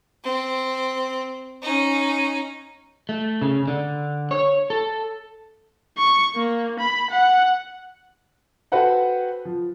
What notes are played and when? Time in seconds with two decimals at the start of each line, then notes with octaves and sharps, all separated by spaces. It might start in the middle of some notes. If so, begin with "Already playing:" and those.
0.24 C4
1.62 C#4 D#4
3.09 A3
3.42 C#3
3.68 D3
4.31 C#5
4.70 A4
5.98 C#6
6.36 A#3
6.80 B5
7.11 F#5
8.72 F#4 A4 B4 C5 F#5 G5
9.45 F3